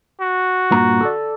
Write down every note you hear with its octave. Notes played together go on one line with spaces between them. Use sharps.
F#4
G2 A#2 A#5
A4 D5